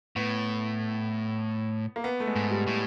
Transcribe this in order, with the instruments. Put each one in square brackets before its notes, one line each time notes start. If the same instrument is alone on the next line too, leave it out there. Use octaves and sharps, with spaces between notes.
[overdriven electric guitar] A2 [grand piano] B3
[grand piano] A#3
B3
A3
G#3
[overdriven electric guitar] G#2
[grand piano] G3
[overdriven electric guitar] A2